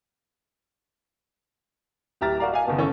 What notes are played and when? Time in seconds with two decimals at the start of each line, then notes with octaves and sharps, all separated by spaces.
2.21 D1 G4 E5 A#5 F6 A6
2.39 F#4 A#4 D5 F5 A#5
2.52 D#5 F5 G#5
2.65 F#1 D#3 B3 A5
2.78 D#3 E3 C#4 A4 C#5